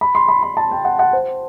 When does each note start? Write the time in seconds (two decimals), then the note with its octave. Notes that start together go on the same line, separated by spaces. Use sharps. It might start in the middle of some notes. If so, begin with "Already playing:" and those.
0.01 B5
0.15 C6
0.28 B5
0.43 B5
0.57 A5
0.71 G5
0.85 F#5
0.99 F#5
1.13 C5